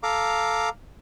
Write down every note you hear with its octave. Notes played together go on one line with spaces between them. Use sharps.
A4 F5 A#5 D6